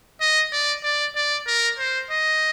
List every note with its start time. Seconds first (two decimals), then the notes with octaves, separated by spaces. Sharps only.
0.21 D#5
0.52 D5
0.84 D5
1.16 D5
1.47 A#4
1.79 C5
2.11 D#5